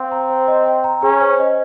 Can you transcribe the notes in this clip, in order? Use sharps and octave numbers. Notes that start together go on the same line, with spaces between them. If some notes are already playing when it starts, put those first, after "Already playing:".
Already playing: C4 F5
A#5
C5
D#5
G5
A#5
C#4 G#4
C5
D#5